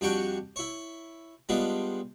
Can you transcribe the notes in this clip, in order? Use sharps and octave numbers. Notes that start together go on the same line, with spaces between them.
F2 G3 D4 F#4 G5 C#6
E4 C#5
G3 G#3 B3 D4 F4